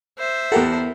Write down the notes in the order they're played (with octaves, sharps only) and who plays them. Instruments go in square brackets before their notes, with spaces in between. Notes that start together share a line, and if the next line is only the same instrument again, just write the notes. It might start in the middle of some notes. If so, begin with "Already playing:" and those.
[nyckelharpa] C5 E5
[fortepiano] E2 G4 F#5 [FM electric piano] A4 A#4